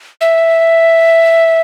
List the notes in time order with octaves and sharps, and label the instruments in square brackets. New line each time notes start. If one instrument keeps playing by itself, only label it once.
[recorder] E5